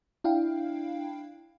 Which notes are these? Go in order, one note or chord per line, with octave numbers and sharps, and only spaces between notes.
D4 E4 F5 G5